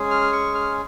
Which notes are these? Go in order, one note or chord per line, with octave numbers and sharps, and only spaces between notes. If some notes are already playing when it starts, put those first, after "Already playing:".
Already playing: G#3 C#4 G#4
F6
C#6
F6